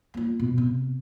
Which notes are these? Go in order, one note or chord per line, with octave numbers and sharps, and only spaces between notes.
A#3 F4
B2
C3